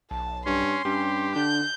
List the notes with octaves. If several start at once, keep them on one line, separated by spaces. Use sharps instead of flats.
B1 A5
G2 C#4 C6
G2 C#4 G4
D3 D4 G6